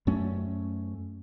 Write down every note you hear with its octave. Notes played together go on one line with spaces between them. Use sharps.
F#2 A3 C#4